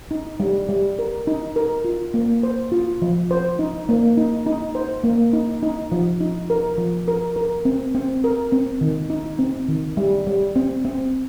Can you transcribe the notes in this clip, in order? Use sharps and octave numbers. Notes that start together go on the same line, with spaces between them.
D#4
G3
G3
A#4
D#4
A#4
F4
A#3
C5
F4
F3
C5
D#4
A#3
D#4
D#4
C5
A#3
D#4
D#4
F3
D#4
A#4
F3
A#4
A#4
C4
C4
A#4
C4
D#3
D#4
C4
D#3
G3
G3
C4
C4